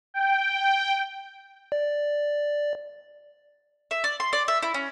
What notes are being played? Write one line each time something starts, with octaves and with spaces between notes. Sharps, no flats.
G5
D5
E5
D5
C6
D5
E5
E4
C#4